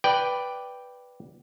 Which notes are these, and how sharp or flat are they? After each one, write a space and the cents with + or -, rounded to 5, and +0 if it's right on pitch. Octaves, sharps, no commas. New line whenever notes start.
B4 +0 D5 +0 G5 +0